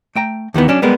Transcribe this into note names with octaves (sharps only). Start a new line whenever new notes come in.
A3 G5 A#5
D#2 D#3 E3 B3
F#3 C#4 D4
G3 G#3 B3 A#4